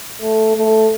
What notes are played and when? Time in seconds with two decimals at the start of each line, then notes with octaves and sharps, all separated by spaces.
0.22 A3
0.56 A3